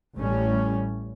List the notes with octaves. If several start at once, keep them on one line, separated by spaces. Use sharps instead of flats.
A1 A2 G3 C#4